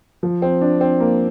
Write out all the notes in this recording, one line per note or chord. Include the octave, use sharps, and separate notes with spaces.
F3
C4
D4
C4
A#3